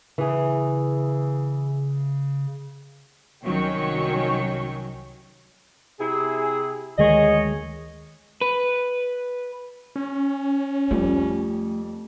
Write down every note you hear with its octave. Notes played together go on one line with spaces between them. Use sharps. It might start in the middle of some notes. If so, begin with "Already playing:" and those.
C#3 E3 G#4
C2 D#3 F#3 C#4 G5 C#6
C3 E4 G#4
D2 D#3 G#3 G#4 C#5 D#5
B4
C#4
F2 G3 A3